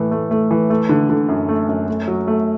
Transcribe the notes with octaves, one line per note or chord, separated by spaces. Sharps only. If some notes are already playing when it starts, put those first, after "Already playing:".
Already playing: A2 E3 A3
A3
A3
E3
A3
D3
D3
F#2
A3
F#2
A3
F#3
A3